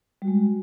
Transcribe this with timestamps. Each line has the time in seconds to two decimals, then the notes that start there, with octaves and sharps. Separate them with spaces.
0.22 G3
0.25 F#4
0.27 G#3